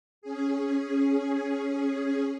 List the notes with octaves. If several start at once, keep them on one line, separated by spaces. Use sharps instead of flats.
C#4 G#4